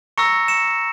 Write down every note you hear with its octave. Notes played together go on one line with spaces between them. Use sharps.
A#5 C#6 E6 A#6 C#7
C#7 E7